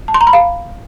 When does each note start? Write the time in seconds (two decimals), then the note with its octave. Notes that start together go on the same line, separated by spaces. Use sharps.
0.08 A5
0.14 C6
0.21 A#5
0.27 B5
0.33 F5